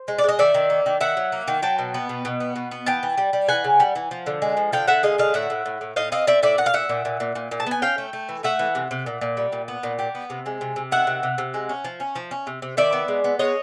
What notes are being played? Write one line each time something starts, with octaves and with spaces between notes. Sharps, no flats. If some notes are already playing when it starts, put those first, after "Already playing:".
Already playing: C5
G#3
D5
G#3 D#5
D#3 D5 E5
D#3
A#3
D#3
D#3 E5 F#5
F#3
A#3
D#3
F#3 G5 A5
B2
B3
B2
B2
B3
B2
B3
E3 G5 A5
E3
G3
G3
E3 F#5 G#5
C#3
G3
E3
F3
D3
G#3
F3
D3 F5 G5
D3 E5 F#5
G#3 D#5 F5
D3 D#5 F5
A2 E5 F#5
A2
A2
A2
A2 D#5 F5
C4 D#5 F5
C4 D5 E5
A2 D5 E5
A#2 F#5
F5
A#2 E5 F#5
A#2
A#2
A#2
A#2
A#2
A5
B3 G#5
C#4 F5 G5
A3
A3
E3
A3 E5 F#5
E3
C3
C3
A#2
A#2
G3
A#2
B3
A#2
G3
B3
C3
G#3
C3
C3
D#3 E5 F#5
C3
C3
C3
G#3
C#4
F3
C#4
F3
C#4
C3
C3
D#3 D5 E5
B3
G#3
B3
G#3 C#5 D#5